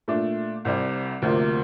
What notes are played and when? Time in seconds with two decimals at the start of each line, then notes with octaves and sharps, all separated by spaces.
0.08 A#2 A3 D4
0.65 C2 C3 G3
1.22 D2 C3 F3 A#3